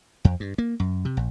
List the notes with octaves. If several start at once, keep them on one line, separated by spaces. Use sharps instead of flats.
F2
G2
A#3
F#2
C3
A#1